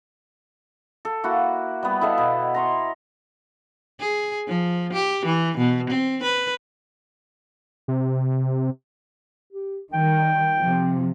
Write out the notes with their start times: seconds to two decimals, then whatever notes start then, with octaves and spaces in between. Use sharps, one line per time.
1.05 A4
1.24 A#3 E4 F#4 F#5
1.83 G3 B3
2.01 E4 A4 D#5 F5
2.18 B2
2.54 A#5 C6 C#6
4.00 G#4
4.48 F3
4.93 G4
5.26 E3
5.57 B2
5.90 C4
6.23 B4
7.88 C3
9.53 G4
9.93 D#3 G3 G5
10.60 C3 F3